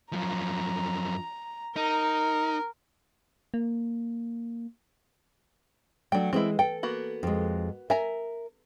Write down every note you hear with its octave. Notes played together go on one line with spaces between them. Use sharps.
F#2 F3 A#5
D#4 A#4
A#3
F#3 A3 D4 G5
E3 G#3 C4 E4
A4 G5
A#3 B3 F#4
F2 G#3
A#4 E5 G#5 A#5